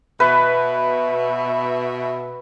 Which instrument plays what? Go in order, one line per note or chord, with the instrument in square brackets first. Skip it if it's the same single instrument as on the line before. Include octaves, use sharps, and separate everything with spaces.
[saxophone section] B2 E5 [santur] B4